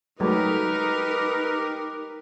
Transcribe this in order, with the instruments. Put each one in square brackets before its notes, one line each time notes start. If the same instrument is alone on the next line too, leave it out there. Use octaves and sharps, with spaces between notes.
[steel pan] F#3 G#3 A3 [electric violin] D#4 A#4 [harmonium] G4 B4